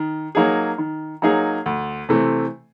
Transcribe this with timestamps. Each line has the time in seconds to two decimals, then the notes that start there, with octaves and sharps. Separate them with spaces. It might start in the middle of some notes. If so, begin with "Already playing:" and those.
Already playing: D#3
0.35 F#3 A#3 D#4 G#4
0.78 D#3
1.22 F#3 A#3 D#4 G#4
1.66 D2
2.09 C3 E3 A3 C4